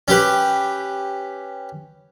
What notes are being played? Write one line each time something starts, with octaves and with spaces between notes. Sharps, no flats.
C#4 G4 B4